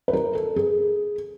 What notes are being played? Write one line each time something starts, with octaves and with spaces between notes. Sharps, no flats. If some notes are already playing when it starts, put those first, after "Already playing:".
B4
A#4
A4
G#4